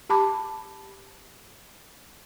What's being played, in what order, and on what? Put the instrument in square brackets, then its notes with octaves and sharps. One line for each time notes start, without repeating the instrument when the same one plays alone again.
[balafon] G4 A5 B5 D6